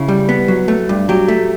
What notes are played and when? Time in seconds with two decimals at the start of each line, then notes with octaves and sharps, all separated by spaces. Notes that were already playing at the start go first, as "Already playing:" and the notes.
Already playing: C#3 E4
0.08 G3
0.29 B3
0.48 F#3
0.68 A3
0.89 G2
1.09 F#3 G4
1.28 A3